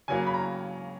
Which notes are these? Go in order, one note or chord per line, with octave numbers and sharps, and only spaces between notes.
C#3 F#3 A#3 G#5
B5
A#5